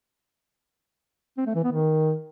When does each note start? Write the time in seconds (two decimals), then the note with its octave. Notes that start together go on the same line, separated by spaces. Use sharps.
1.38 C4
1.46 A3
1.55 E3
1.64 B3
1.72 D#3